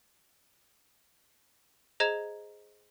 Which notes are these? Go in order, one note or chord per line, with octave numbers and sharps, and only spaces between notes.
G#4 C5 D#5 A#5 G#6 E7